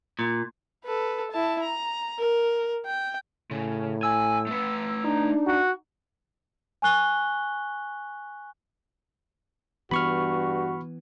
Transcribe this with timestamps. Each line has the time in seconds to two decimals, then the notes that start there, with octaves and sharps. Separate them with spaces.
0.19 A#2
0.84 A4 B4
1.31 E4 A5
1.62 A#5
2.19 A#4
2.86 G5
3.51 A2 C#3
4.03 G#5 E6
4.47 A3 B4
5.04 D4 D#4
5.47 F#4
6.82 G#5 C#6 F#6 G7
9.91 G2 E3 B3 F#4 B5 C#6 F6